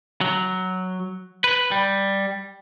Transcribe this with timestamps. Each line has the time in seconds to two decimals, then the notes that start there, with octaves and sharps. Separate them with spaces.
0.21 F#3
1.44 B4
1.71 G3